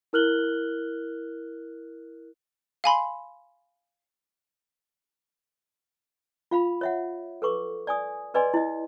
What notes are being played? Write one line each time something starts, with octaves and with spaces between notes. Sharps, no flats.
E4 A#4 F6 F#6 F#7 G7
F5 G#5 B5 C6
F4 F5 B5
C#5 E5 F#5
A4 B4 C#6 D6
D5 G#5 D#6
G#4 B4 D5 D#5 G#5 C6
E4 D#5